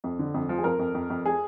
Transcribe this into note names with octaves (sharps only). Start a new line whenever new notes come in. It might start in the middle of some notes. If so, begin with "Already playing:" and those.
F2
D3
F2
F3
G#4
F2 A#4
F2
F2
F2
G#4